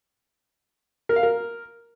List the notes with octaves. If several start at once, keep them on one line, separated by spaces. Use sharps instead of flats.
A#4
F5
A#4